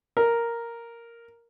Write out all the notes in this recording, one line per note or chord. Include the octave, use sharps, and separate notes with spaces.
A#4